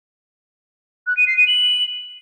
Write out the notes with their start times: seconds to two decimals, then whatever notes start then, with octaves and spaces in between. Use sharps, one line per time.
1.07 F#6
1.17 D#7
1.27 C7
1.37 D#7
1.47 F#7